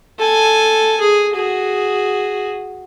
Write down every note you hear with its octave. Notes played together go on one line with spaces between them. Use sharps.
A4 G#5
G#4
F#4 G#4